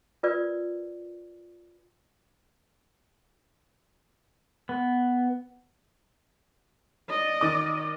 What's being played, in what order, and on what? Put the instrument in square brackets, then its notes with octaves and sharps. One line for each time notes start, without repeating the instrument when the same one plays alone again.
[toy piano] F4 A#4 B4 D5
[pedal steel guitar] B3
[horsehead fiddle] D5 D#5
[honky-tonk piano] D#3 D6